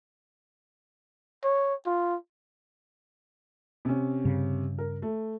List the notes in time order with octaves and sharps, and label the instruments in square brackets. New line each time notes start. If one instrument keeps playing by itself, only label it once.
[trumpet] C#5
F4
[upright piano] C3 C#4
[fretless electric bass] G2 C#3
[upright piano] A#4
A3